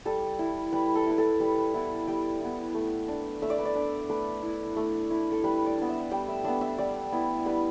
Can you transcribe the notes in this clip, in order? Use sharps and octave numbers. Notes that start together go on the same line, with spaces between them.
G3 A4
E4
G3 B4
A4
E4 B4
A4
G3 B4
B3 E4
G3 G5
B3 E4
A3
D4
A3 E5
D5
B4
D5
D4
A3 B4
E4
A3
E4
A4
G3 B4
D5
B3 D4
E5
G3 G5
E5
B3 D4 E5
E5
G3 D5
B3 E4
G3 B4